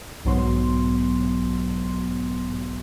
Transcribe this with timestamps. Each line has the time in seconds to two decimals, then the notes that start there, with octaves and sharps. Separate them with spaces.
0.25 B1 G#2 F#3 B3 C6